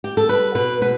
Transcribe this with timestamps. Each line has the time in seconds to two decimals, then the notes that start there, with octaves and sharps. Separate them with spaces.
0.04 G4
0.17 A4
0.29 G3 B4
0.55 B2 B4
0.81 B2 B4